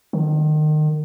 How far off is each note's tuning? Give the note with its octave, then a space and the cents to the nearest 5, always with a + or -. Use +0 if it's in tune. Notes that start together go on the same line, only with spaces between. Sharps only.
D#3 -30